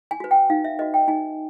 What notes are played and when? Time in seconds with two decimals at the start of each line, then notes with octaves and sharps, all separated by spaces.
0.11 G#5
0.20 F#4 B4
0.31 G5
0.50 D#4 F5
0.64 E5
0.79 F#4 B4 D#5
0.94 G5
1.08 D#4 G#5